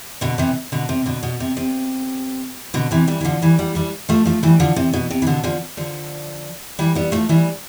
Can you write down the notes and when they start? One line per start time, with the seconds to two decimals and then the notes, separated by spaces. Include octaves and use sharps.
0.21 B2 D3
0.38 C3 E3
0.72 B2 D3
0.89 C3
1.06 B2 D3
1.23 B2
1.40 C3
1.57 C3
2.74 B2 D3
2.91 C3 E3
3.08 E3 G3
3.21 E3
3.25 D3 F3
3.42 E3 G3
3.59 G3 B3
3.75 E3 G3
4.09 F3 A3
4.25 F3 A3
4.43 E3 G3
4.60 D3 F3
4.76 C3
4.93 B2
5.10 C3
5.22 E3
5.27 B2 D3
5.44 D3 F3
5.77 D3 F3
6.79 E3 G3
6.95 G3 B3
7.12 F3 A3
7.29 E3 G3